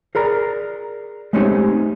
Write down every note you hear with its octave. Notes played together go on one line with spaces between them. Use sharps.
G#4 A#4 D5 A#5
G#3 A3 C4 C#4 D#4 G4